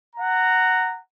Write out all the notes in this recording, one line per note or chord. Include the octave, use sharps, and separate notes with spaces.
F#5 A#5